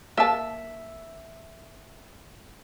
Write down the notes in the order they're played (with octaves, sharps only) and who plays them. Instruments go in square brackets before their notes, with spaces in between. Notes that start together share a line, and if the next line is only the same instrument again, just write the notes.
[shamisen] A#3 A5 [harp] E5